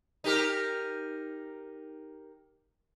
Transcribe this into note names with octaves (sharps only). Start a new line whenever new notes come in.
D#4 G4 A#4